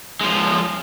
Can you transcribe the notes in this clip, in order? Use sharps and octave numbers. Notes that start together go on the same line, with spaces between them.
F3 G#3